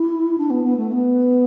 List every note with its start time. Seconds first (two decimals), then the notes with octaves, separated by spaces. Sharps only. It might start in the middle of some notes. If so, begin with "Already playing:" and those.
Already playing: E4
0.37 D4
0.50 B3
0.63 B3
0.76 A3
0.91 B3